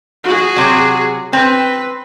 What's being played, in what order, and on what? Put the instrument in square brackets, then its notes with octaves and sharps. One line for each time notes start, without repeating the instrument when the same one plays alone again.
[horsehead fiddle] F#4 G#4
[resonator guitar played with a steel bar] C3 F#3
[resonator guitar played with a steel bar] C4 [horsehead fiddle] B4